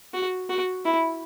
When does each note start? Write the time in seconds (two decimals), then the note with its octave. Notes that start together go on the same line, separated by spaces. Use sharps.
0.14 F#4
0.49 F#4
0.84 E4